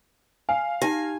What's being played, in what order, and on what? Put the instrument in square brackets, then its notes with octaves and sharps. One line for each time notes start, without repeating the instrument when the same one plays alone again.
[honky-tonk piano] F5 [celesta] G#5
[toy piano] D#4 G4 [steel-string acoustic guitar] G#5 [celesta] A#6